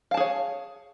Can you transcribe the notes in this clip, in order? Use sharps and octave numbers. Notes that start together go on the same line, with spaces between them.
G#4 C#5 F5 A5